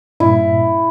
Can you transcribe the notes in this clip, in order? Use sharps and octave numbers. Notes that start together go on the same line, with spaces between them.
G2 A#2 E4